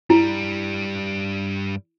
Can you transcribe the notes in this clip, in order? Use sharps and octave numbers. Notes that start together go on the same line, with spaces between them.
G2 G3 E4